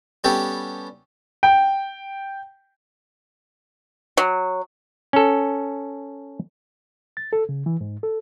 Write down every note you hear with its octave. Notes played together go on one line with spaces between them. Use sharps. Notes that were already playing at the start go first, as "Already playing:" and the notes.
G3 B3 C#4 G4 A4
G5
F#3
C#4 A4
A6
A4
C#3
E3
G#2
A4